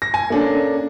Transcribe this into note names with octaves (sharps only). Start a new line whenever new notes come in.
A#6
G#5
A#3 C#4 D4 A4